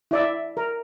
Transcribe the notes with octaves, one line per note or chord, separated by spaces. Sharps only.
E4 D5 E5
A#4